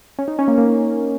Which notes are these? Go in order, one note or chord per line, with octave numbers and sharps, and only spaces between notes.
C#4
D#4
C#4
A#3
A#3